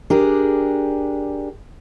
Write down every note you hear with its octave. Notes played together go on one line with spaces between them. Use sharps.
D4 G4 G#4 A#4